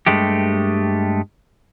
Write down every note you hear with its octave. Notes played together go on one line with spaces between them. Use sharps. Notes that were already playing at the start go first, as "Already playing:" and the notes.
G2 G#3 A3 G4